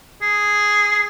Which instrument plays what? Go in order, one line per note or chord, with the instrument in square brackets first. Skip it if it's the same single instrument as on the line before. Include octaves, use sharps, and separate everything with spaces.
[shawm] G#4